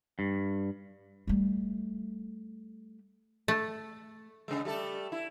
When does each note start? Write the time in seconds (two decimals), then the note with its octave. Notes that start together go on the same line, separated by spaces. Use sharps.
0.19 G2
1.27 G3 A3
3.48 A3
4.48 C#3 G#3
4.65 G3 A3 A4
5.12 E4